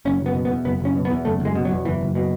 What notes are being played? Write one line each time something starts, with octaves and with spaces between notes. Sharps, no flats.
F#1 C#4
F#1
B3
B2
B3
E2
F#1 B3
F#1 C#4
B2
B3
E2
F#1 A3
F#1
G#3
B2
F#3
E2
F#1 E3
F#1
B2